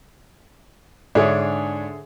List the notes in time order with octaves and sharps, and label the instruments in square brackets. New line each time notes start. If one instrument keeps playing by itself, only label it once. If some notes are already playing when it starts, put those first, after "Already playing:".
[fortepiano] G#2 D4 C#5 [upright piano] D3 G#4 E5